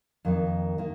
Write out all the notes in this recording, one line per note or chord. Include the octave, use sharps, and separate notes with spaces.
F2 D#3 A#3 D#4
D#3 A#3